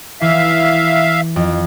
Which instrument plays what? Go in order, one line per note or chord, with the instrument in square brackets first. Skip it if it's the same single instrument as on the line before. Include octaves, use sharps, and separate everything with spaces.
[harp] E3 [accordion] E5 F5
[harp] F2